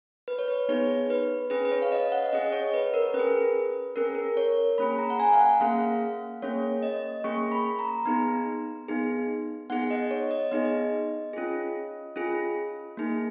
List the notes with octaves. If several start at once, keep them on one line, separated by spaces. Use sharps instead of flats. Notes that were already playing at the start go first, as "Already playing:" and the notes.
B4
C#5
B4
B3 D#4 G#4 C#5
B4
C#4 G#4 B4
B4
C#5
F5
D#5
F#5
C#4 G#4 D#5
C#5
B4
A#4
C#4 B4
G#4
C#4 G#4 A#4
A#4
C#5
A#3 C#4 G#4 B5
A#5
F#5
G#5
F5
F#5
A#3 C#4 G#4 F5
A#3 C#4 G#4 C#5
D#5
A#3 C#4 G#4 C#6
B5
A#5
B3 D#4 G#4
B3 D#4 G#4
B3 D#4 G#4 F#5
D#5
C#5
D#5
B3 D#4 G#4 D#5
C#4 F4 G#4
C#4 F4 G#4
A#3 D#4 G#4